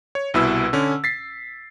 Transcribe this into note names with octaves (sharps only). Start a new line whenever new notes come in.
C#5
C2 B2 E4 B4 E6
D3 C#4
A6 B6 C7